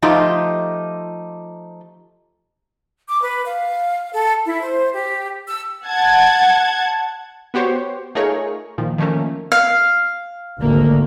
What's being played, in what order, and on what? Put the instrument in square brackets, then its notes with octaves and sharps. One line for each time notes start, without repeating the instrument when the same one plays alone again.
[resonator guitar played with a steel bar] F3 A3 D#4 F4 G4
[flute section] D6
B4
F5
A4
E4
C5
G4
E6
[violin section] F#5 A5 G#6
[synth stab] B3 F#4 G4 C5 C#5
A3 D#4 F4 G#4 A#4 C#5
A#2 D#3 F3
D#3 F3 A3 A#3 C#4
[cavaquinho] F5
[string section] G#1 A#3 [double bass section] D2